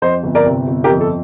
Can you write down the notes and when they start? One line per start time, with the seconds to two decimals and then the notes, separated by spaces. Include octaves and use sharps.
0.02 F2 C5 D#5
0.23 G1
0.35 A#4 D5
0.46 C3
0.68 G1
0.84 G4 A#4
0.90 F2
1.01 A4